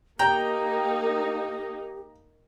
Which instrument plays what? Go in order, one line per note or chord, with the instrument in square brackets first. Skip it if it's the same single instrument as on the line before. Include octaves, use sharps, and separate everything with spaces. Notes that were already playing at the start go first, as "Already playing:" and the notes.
[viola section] A#3 D#4 [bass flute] G4 [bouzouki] G5 [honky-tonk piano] A#5